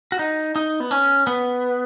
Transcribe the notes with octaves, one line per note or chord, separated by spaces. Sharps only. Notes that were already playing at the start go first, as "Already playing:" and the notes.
F#4
D#4
D#4
B3
C#4
B3